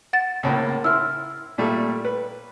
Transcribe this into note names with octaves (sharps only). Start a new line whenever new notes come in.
F#5 A6
C#2 A2 A#3
E4 C6 E6 F6
A#2 G3 A3
B4